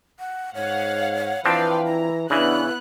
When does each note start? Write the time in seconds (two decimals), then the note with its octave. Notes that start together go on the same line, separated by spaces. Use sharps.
0.19 F#5
0.55 G#2 C#5 F5 F#5
1.45 E3 F3 C4 D4 B4 F5 G5 A5
1.85 E4 A#5
2.30 C#3 E3 B3 D4 E4 F#6